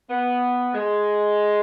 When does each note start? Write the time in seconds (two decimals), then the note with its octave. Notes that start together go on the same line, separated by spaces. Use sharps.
0.09 B3
0.74 G#3